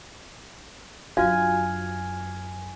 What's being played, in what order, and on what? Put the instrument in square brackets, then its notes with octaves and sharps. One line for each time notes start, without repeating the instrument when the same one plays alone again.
[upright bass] F#2 D4 [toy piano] F4 F#4 F5 [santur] G#5 [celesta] F6 G#6